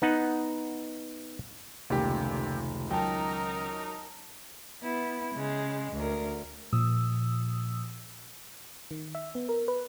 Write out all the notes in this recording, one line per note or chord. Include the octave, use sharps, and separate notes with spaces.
B3 D#4 F#5
F1 C#2 A#2 D#3 G4
F#3 D#4 A#4 G5 A5 A#5
B3 E4
C#3 G#3
D2 A#4
A#2 F3 D#6 E6
D#3
E5
B3
A#4
B4